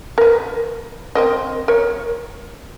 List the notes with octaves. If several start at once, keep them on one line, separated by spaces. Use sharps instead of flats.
A#4 B4
C4 A#4 D#5
A#4 C#5